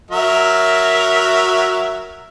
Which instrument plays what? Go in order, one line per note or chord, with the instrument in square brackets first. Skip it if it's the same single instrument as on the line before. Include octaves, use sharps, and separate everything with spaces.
[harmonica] F#3 A#4 E5